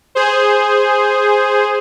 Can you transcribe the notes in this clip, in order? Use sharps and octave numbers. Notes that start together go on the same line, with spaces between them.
G#4 C5